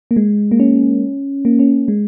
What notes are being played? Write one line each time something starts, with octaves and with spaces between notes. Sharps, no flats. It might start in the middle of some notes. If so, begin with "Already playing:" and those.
A#3
G#3
A#3
C#4
A#3
C#4
G#3